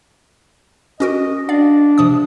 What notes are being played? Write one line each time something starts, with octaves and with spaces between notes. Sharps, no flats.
C#4 F#4 A#4 D#5
D4 D5 F5
C3 F3 D#6